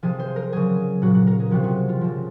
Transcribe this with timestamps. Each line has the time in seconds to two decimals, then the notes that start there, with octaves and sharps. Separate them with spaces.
0.03 C3 F3 G#4
0.20 C5
0.36 A#4
0.52 C#3 F#3 G#4
1.02 A#2 F#3 F#4
1.15 F#4
1.27 A#4
1.40 G#4
1.51 C3 F3 F#4
1.64 F#4
1.89 F4
2.01 C#3 F3